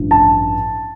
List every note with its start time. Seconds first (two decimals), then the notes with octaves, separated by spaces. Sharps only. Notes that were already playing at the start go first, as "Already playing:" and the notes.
Already playing: A1 G2 F3 D4
0.11 A5